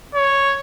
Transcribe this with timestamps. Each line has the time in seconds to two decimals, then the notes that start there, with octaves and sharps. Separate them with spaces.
0.15 C#5